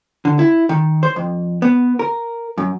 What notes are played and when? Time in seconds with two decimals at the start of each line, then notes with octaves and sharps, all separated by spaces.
0.25 D3
0.39 E4
0.69 D#3
1.03 C5
1.16 F2
1.62 B3
1.99 A#4
2.58 F#2